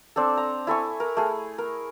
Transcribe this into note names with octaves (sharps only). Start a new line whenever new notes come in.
C4 D4 A4
A#5
E4 A4 G#5 C#6
A#4
A3 G#4
A#4